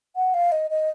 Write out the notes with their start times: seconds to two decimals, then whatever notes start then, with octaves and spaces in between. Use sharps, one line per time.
0.16 F#5
0.34 F5
0.52 D#5
0.71 D#5